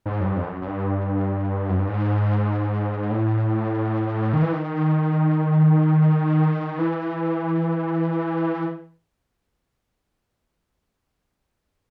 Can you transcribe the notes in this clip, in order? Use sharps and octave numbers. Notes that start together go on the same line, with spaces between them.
G#2
F#2
G2
F2
F#2
F#2
G2
F#2
G2
G#2
A2
D#3
E3
D#3
E3